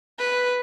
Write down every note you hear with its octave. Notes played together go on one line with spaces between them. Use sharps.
B4